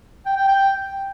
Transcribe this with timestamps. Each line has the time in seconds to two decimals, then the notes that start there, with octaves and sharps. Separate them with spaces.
0.26 G5
0.37 G5
0.48 G5